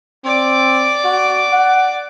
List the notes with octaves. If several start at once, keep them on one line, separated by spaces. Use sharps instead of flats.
C4 D5 D6
F#4
F#5